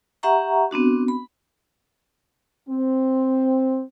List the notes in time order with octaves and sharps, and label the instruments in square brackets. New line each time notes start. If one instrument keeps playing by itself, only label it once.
[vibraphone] G4 E5 F#5 A#5 C#6
B3 C4 D4 F#4
B5
[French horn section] C4